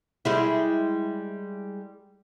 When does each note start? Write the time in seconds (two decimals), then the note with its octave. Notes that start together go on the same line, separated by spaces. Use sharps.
0.25 G3 G#3 E4